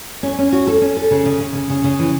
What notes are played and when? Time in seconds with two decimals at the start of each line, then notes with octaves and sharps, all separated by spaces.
0.23 C#4
0.39 C#4
0.52 F#4
0.67 A4
0.82 C#4
0.97 A4
1.11 C#3
1.25 C#3
1.40 C#3
1.55 C#3
1.70 C#3
1.84 C#3
1.99 E3